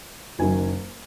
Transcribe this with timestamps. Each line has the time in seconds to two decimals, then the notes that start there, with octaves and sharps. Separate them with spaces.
0.39 F#1 F#2 D#3 F#3 G#5